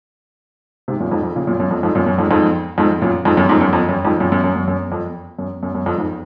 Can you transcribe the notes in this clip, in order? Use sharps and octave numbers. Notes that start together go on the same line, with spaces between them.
G#2 C3
F#2 A#2
F2 G#2
F2
A#2 C#3
F#2 A#2
F#2
F2
F2 G#2
F#2 A#2
F#2
F2 G#2
F2 G#2
F2 G#2
F#2 A#2
F2 G#2
F#2
F2 G#2
F#2
F2
F#2
F2 G#2
F#2 A#2
F#2
F#2
F#2
F#2
F2
F#2
F#2
F#2
F2
F2 G#2